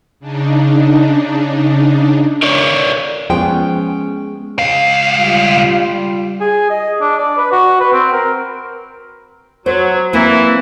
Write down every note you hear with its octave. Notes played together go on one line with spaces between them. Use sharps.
C#3 D4 D#4
A#4 C#5 D5
F3 G#3 B3 C#4 G#4 G5
C#2 F5
G3 F4
G#4
D#5
D4
D5
B4
F#4
B4
C4
A#4
F#3 C5
E3 A#3 C4 E4